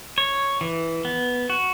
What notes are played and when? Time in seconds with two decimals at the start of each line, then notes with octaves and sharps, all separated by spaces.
0.18 C#5
0.61 E3
1.05 B3
1.50 F#4